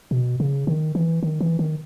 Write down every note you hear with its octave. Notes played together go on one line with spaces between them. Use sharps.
B2
C#3
D#3
E3
D#3
E3
D#3